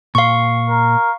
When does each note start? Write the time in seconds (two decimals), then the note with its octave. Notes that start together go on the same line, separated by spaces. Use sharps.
0.15 A#2 F5 C6 C#6
0.69 A#4